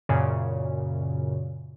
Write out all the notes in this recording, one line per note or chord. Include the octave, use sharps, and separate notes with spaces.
F#2 A#2 C#3